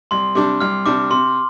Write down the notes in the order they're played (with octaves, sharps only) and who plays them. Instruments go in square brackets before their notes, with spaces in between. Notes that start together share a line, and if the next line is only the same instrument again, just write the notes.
[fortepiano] C2 [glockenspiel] C6
[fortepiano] C3 G3 D4 [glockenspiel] D6
[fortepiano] C2 [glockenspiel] F6
[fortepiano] C3 G3 D4 [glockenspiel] D6
[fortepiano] C3 [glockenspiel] C6